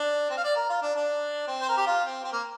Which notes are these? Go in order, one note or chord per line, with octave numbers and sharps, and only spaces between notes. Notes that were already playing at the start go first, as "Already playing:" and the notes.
Already playing: D4
C4
F5
D5
A#4
F4
D4
D4
C4
C5
A#4
G4
F4
C4
C4
A#3